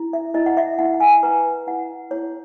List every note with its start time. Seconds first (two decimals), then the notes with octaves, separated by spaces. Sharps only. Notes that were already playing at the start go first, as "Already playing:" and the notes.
Already playing: E4
0.13 E5
0.34 E4 D#5
0.46 F#5
0.57 E5
0.79 E4 F#5
0.94 F#5
1.00 G#5
1.23 B4 A#5
1.67 E4 F#5
2.11 E4 C#5